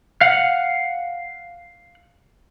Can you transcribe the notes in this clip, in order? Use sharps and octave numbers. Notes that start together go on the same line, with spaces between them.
F5 F#5